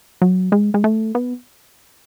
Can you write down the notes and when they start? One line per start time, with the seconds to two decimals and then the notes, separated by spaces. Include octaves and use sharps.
0.21 F#3
0.52 G#3
0.74 G#3
0.84 A3
1.15 B3